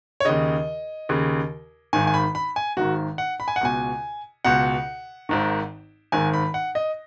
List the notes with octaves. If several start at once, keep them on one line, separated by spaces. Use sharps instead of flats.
C#5
D#2 C#3 D#5
D#2 C#3
G#1 G#2 D#3 G#5
G#5
B5
B5
G#5
G#1 G#2 D#3 F#4
F#5
B5
G#5
F#5
C#2 B2 G#5
C#2 B2 F#5
G#1 G#2 D#3
G#1 G#2 D#3 G#5
B5
F#5
D#5